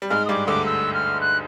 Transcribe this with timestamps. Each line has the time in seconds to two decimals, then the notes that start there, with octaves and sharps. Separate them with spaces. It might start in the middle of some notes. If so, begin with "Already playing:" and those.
0.02 G3
0.10 G#2 G#3 F6
0.26 D#6
0.29 G2 G3 D6
0.47 D2 D3 D6
0.66 E6
0.94 F6
1.21 F#6